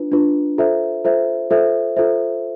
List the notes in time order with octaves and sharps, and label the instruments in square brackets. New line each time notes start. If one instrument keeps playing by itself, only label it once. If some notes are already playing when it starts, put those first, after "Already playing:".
Already playing: [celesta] D4 F4 B4
D4 F4 B4
F4 A4 C5 E5
F4 A4 C5 E5
F4 A4 C5 E5
F4 A4 C5 E5